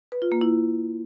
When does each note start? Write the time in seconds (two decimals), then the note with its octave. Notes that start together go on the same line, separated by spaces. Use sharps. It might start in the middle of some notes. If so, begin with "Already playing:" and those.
0.12 B4
0.22 F4
0.32 A#3
0.41 E4